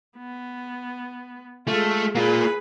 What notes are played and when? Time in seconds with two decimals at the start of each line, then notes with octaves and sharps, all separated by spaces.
0.18 B3
1.67 G#3 A3 F4
2.15 A#3 F4 G#4 B4